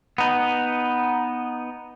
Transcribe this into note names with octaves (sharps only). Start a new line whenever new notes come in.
B3 D#4